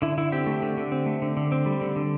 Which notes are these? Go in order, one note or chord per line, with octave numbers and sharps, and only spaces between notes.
D3 E4
D3 E4
C4 G4
A3
D3
D3
C4
A3
D3
D3
C4
G3
D3
D3